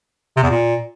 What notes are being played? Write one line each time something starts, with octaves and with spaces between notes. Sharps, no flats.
C3
E2
A#2